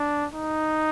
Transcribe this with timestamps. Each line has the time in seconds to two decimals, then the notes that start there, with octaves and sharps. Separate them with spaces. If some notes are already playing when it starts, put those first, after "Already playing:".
Already playing: D4
0.33 D#4